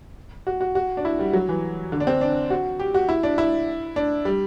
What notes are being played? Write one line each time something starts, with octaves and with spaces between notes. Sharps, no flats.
F#4
F#4
F#4
D4
E4
G3
F#3
E3
D3
D4
C4
D4
F#4
G4
F#4
E4
D4
E4
D4
G3